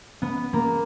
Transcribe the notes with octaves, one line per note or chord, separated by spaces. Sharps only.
B3
A#3